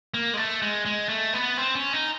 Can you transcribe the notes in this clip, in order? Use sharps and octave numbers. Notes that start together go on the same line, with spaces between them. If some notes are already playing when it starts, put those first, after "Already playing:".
A#3
G#3
A3
G#3
G#3
A3
B3
C4
C#4
D#4